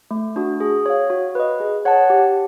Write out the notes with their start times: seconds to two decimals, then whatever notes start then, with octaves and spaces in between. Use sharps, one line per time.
0.11 A3
0.36 D4 F#4
0.60 G#4
0.86 C#5 F5
1.10 F#4
1.35 B4 D#5
1.60 G#4
1.85 C#5 F#5 A5
2.10 G4